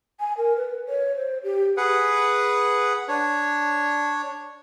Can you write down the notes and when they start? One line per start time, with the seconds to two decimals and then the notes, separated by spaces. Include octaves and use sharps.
0.20 G#5
0.38 A#4
0.57 B4
0.88 C#5
1.16 C5
1.44 G4
1.77 G#4 B4 F#5
3.08 D4 C#5